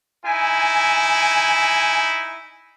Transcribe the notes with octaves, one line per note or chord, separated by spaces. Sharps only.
D#4 E4 G#5